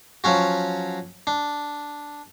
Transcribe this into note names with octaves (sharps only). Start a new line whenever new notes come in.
F3 F#3 C#4 F#4
D4